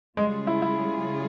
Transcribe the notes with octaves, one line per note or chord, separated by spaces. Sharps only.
C#3 G3 G#3 C#4 F4 G#4
E4
E4